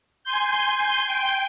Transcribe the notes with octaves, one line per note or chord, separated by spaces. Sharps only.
G#5 C6 G6
G5